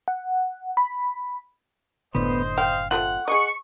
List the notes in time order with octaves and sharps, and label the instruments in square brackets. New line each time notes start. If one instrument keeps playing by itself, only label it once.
[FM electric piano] F#5
B5
[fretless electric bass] F#1 A2 D3 [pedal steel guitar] B3 [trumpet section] C5 D#5
[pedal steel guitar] F5 [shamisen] G5
[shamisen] A3 C4 F4 [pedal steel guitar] F#5
[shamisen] G#4 D#5 [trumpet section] C#6